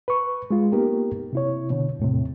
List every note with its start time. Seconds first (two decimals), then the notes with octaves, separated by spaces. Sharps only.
0.08 B4 C#6
0.51 G#3 F4
0.72 A#3 B3 D#4 G4 A#4
1.33 C3 E4 C#5
1.70 B2 D3
1.99 E2 A2 C3